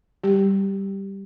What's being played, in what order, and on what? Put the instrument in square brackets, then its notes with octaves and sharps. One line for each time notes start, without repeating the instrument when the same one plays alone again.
[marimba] G3 [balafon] G4